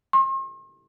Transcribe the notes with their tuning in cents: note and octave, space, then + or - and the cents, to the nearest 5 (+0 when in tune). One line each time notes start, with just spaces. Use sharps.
C6 +45